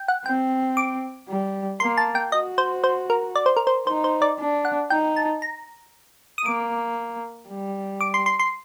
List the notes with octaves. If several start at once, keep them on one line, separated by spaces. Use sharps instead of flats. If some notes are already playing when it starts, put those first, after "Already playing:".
Already playing: G5
F#5
C4 G5
D6
G3
A#3 C6
A5
G5
F#4 D#5
C5
C5
A#4
D5
C5
A#4
C5
D#4 C5
C5
D5
D4
F#5
D#4 G5
A5
A#5
D#6
A#3 D6
G3
D6
C6
C6
C6